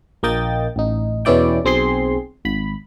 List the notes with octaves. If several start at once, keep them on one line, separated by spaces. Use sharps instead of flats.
A#1 A#3 D#5 G5 A6
A1 D#4
E2 B2 C#4 E4 D5 G5
B1 C4 G#4 C6
G#1 B5